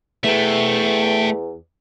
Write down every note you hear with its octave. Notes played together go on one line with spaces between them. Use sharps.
E2 A3 E5 G5